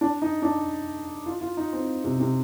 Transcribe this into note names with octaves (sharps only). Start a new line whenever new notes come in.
D4
D#4
D4
F4
F4
D#4
C4
C3
C3